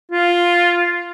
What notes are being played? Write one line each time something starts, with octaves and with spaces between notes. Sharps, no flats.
F4